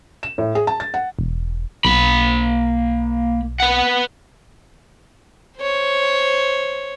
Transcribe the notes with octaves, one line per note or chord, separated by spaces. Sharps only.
E7
A2
G#4
A5
A6
F#5
E1
B1 A#3 B5
B4 F#5
C5 C#5